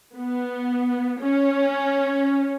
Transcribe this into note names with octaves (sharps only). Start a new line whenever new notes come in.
B3
C#4